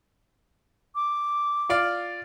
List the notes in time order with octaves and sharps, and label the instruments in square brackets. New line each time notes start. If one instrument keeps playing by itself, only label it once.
[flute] D6
[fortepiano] F4 D5 F5